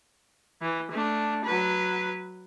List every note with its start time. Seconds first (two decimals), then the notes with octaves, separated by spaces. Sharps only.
0.62 E3
0.91 A3 D4
1.45 F#3 B4